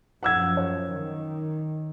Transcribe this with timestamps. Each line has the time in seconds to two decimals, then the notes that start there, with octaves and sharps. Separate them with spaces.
0.23 F#2 F3 F#5 E6 G#6
0.57 C#5
0.94 D#3